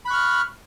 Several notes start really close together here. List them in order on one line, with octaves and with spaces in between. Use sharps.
B5 F#6 C#6 F6